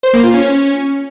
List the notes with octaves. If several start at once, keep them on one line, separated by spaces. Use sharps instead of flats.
C5
A#3
F4
C#4